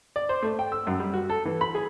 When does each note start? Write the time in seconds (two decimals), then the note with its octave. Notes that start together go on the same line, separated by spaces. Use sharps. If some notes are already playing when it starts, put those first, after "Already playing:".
0.16 D5
0.29 C5
0.43 A3
0.59 G5
0.72 E6
0.87 F#2
1.00 G3
1.14 F#4
1.30 A4
1.45 E3
1.61 B5
1.75 G#4